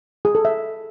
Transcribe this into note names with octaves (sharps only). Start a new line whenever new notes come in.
G#4
A4
E5